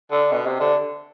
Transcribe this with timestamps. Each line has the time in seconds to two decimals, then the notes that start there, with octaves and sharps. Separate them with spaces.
0.11 D3
0.32 B2
0.46 C3
0.60 D3